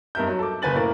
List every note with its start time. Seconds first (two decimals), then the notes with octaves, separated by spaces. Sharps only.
0.15 G2 D#4 A#4 E5 G6
0.28 F#3
0.39 A4 D6
0.62 F#1 A#3 B4 G#5 A6 F#7
0.76 A2 A#3 A#4 A6